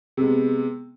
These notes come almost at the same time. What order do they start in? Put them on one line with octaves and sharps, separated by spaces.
C3 G#3 B3